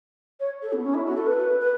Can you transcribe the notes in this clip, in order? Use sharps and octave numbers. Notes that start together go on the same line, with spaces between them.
C#5
A4
B3
C#4
E4
F#4
A4
B4
B4